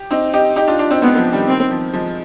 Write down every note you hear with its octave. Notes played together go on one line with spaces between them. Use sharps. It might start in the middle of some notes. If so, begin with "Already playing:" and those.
Already playing: G4
C4 D#4
D#4 G4
D#4 G4
D4 F4
D4 F4
C4 D#4
G#3 B3 C4
F3 G#3
D#3 G3
D#3 C4
F3
F3 G#3